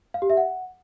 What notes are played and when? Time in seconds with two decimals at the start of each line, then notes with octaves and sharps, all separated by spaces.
0.14 F5
0.22 G4
0.30 E5
0.37 F#5